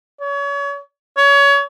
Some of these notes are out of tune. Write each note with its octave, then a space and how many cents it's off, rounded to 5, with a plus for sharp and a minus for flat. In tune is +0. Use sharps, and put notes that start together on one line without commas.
C#5 +35
C#5 +30